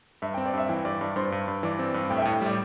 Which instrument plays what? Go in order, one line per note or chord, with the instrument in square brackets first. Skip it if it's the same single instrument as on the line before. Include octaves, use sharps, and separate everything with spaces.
[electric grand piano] G2 [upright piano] E5
[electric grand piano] C4 [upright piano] G5
[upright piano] D5
[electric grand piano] G2 [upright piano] E5
[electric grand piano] E3 [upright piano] G5
[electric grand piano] G2 [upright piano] D5
[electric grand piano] G2 [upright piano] D5
[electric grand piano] G2 [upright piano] C5
[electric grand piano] G2
G2
[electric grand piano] E3 [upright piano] D5
[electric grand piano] C4
G2
[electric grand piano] A2 [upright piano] G5
[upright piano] E5
[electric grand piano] A2 [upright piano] G5
[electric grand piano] G3 [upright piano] D5